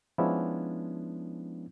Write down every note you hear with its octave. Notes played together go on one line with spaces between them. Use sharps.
F3 G#3 B3 C#4 D4 E4